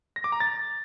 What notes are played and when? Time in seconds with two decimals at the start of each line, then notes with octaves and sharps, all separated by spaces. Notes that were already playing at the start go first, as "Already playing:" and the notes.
0.16 A#6
0.24 D6
0.32 A#5
0.40 A6